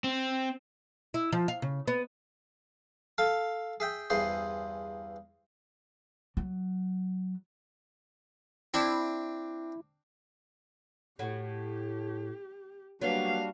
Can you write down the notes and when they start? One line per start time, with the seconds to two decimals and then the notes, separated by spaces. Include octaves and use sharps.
0.04 C4
1.14 E4
1.32 F3
1.48 F5
1.62 C#3
1.88 B3
3.18 A4 F5 A5
3.80 G#4 E5 G5
4.10 E2 G2 E3 G#4 C5 C6
6.37 F#3
8.74 C4 D4 E4
11.19 A2 F#4 G4
13.01 F#3 G3 A#3 B3 D4 F#4 F5